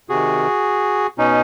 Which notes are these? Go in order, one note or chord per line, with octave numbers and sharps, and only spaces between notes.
C3 D#3 F#4 G#4
B2 C#4 D#4